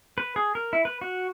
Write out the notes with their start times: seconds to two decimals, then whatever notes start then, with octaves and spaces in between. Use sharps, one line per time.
0.18 B4
0.36 G#4
0.55 A#4
0.73 E4
0.85 B4
1.01 F#4